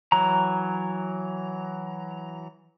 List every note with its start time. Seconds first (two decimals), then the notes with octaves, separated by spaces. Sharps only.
0.12 E3 F#3 A#5